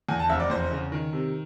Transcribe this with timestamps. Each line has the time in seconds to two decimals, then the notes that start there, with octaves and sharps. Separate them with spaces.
0.09 E2 G#5
0.19 A5
0.29 F1 E5
0.40 D5
0.50 E2 C5
0.71 C#3
0.92 D#3
1.13 C3